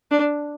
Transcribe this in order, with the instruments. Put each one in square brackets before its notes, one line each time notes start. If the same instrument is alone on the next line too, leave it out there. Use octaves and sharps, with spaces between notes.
[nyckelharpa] D4